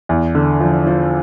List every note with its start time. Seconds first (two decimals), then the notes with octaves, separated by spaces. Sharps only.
0.09 E2
0.35 D3
0.61 F3
0.87 F3